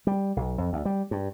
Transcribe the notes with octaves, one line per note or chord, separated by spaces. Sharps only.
G3
B1
F2
D2
G3
G2